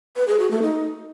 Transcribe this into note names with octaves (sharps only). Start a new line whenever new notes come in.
B4
G#4
F#4
A3
D#4